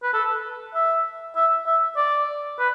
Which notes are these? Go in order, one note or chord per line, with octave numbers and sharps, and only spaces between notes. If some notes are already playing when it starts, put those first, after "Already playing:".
B4
A4
E5
E5
E5
D5
B4